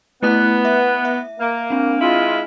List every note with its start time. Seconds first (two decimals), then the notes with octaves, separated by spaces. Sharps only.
0.23 A3 B3 E4 F#6
0.65 E5
1.05 E5
1.40 A#3
1.70 C4 D4
2.01 G#3 E4 F4